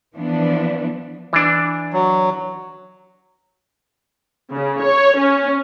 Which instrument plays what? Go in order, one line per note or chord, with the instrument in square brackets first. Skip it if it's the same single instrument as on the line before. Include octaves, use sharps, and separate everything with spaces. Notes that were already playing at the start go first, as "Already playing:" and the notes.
[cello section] E3 F3 B3 D4
[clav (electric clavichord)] E3 D4
[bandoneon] F#3
[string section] C#3
C#5
C#4